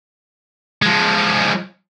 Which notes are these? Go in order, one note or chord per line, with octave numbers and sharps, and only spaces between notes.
F3 G#3